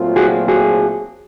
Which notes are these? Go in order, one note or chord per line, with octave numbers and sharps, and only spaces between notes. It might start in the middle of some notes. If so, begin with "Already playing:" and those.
Already playing: A#2 F#3 A3 C4 F4
F#4 G#4
F#4 G#4